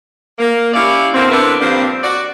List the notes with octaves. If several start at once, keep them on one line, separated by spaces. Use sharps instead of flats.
A#3
G3 C#4 E4 D5 F5
B2 D3 A#3 C4
D3 B3 D4 E4 A#4 B4
G2 A#2 F3 A#3 C4 D4
F#4 D5